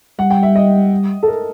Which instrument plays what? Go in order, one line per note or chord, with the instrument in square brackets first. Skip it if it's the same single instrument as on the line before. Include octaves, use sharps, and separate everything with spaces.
[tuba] G3 [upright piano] F#5
[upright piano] G5
E5
D#5
A4
A#4